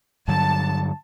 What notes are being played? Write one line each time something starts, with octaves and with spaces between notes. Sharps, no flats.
G2 D3 F#3 A5